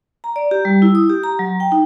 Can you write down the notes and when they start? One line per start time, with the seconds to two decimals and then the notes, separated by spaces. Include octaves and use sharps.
0.24 A#5
0.36 D5
0.51 G4
0.65 G3
0.82 E4
0.95 D#6
1.10 G4
1.24 A#5
1.39 F#3
1.60 G5
1.72 D#4